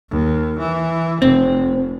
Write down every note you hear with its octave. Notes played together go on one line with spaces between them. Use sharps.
D#2
E3
F1 C4